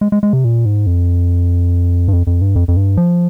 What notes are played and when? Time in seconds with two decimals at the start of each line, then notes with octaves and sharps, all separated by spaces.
0.01 G#3
0.12 G#3
0.23 G#3
0.33 C3
0.45 A#2
0.65 G#2
0.86 F2
2.08 G2
2.13 F2
2.27 F2
2.42 G2
2.56 F2
2.68 F2
2.76 G2
2.97 F3